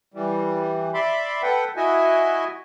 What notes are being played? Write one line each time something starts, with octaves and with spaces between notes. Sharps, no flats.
E3 G3
D5 E5 B5 C6 D6
A4 B4 F#5 G5
E4 F#4 D#5 E5 G#5